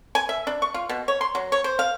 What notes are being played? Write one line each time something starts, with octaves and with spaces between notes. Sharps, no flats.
G#5
E5
D4
C#6
F4
B2
C#5
C6
F#3
C#5
C5
F5